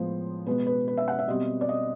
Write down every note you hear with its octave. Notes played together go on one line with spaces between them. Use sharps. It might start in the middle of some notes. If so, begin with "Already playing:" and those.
Already playing: A2 F3 G#3 B3 C5
B2 G#3 B3 B4
B4
B4
E5
F#5
E5
B2 G3 C4 D#5
D5
D#5